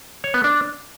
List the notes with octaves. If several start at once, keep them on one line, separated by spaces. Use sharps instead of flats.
C#5
B3
D4